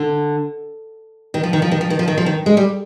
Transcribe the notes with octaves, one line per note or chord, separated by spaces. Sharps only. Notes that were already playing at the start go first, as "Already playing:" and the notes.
Already playing: D3
D#3
F3
D#3
F3
D#3
F3
D#3
F3
D#3
F3
D#3
G#3
G3